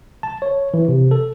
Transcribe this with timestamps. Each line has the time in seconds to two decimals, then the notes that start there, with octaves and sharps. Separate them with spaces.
0.23 A5
0.42 C#5
0.74 E3
0.89 C3
1.11 A4